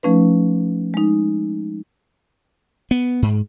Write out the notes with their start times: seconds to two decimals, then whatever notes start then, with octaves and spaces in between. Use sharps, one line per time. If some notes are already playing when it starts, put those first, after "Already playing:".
0.03 F3 A3 C#4 D#4 B4
0.94 G#3 D#4
2.91 B3
3.22 G#2